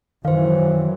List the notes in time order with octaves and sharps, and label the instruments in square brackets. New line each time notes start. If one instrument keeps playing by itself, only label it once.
[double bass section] F#2 E3 F#3 [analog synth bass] D#3 [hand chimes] C5 F5